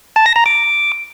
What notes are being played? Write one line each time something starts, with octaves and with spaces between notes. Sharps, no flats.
A5
A#6
A#5
D6